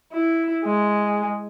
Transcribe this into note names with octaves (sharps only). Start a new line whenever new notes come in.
E4
G#3